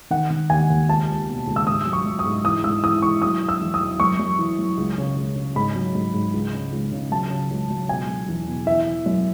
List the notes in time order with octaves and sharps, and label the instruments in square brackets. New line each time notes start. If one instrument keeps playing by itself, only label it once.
[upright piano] D#3 F#5
D#3
D#2 G#5
D#2
C#2 A5
C#2
B2
C#2
E6
G#2 D#6
F#3
C#6
F#3
D#6
G#2
E3 D#6
G#2 E6
E3 D#6
E3 C#6
F#3 D#6
F#3
E6
E2
D#6
F#3
F#2 C#6
F#2
E3
F#2
C#2
C#3
C#2
C#3
G#2 B5
F#3
G#2
G#2
C#2
C#3
C#2
C#3
F#3 A5
C#3
C#2
F#3
B2 G#5
F#3
E2
B2
E3 E5
E3
F#2